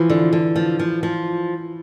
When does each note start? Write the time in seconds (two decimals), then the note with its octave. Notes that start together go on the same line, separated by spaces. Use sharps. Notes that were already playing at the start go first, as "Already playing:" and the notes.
Already playing: E3 F3
0.10 D3
0.33 D3
0.56 F3
0.79 F3
1.03 F3